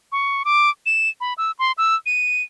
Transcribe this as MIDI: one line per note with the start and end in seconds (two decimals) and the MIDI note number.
0.12 0.43 85
0.45 0.70 86
0.86 1.09 100
1.21 1.34 83
1.38 1.51 88
1.59 1.72 84
1.78 1.95 88
2.06 2.43 99